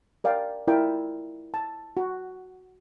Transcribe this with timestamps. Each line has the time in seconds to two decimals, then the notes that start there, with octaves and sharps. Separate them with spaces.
0.24 A#4 D5 F5 G5
0.68 E4 F4 A#4 D5 E5 G5
1.54 A5
1.97 F#4